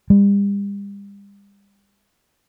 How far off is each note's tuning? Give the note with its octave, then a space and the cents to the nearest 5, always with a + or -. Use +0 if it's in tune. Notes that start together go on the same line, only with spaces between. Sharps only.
G3 +40